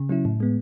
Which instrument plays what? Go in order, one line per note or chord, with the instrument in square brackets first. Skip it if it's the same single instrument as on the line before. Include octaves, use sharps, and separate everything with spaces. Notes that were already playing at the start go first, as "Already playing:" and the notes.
Already playing: [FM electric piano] C#3
F#3 C#4 E4
A2
G#3 B3